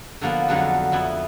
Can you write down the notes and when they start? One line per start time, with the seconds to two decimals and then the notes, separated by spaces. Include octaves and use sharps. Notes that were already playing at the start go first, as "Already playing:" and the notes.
0.21 D3 F3 A#3 B3
0.48 F2 D3 F#3 G#3 A4 F#5
0.92 F2 B3 E4